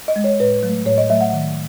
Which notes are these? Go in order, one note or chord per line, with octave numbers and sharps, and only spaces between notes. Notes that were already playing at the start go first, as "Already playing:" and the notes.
D#5
G#3
C#5
A2 B4
F#3 A3
A2 C#5
D#5
F#3 A3 E5
F#5
D#3